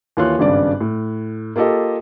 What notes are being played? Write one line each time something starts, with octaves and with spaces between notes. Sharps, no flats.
D#2 E3 F4 C#5 C6 F#6
G#1 G2 C#3 D4 D5
A2
A#3 F4 G4 A4 D#5